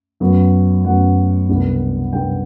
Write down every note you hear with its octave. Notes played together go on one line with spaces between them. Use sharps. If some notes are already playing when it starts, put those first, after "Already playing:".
F#2 F#3 B3
F#2 F#3 B3 F#5
C2 B2 G3 B3 D4
C2 B2 G3 B3 D4 G5